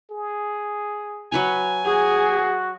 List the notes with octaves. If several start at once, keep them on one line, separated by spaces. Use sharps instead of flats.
G#4
F#3 B4 C#5 G#5
F#4 G#4